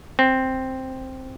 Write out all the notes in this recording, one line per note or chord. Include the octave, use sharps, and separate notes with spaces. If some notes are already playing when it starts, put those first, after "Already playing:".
C4